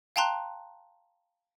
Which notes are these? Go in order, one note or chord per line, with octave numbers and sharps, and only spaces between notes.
F5 G5 A5 A#5 C6 F#6